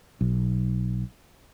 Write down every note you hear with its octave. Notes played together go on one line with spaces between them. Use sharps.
B1